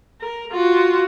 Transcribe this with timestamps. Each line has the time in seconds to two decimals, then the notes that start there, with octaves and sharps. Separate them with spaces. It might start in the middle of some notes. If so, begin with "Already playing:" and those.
0.21 A#4
0.52 F4 F#4